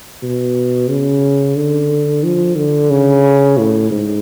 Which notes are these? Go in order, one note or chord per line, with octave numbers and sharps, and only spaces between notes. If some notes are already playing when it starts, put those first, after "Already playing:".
B2
C#3
D3
F3
D3
C#3
A2
G#2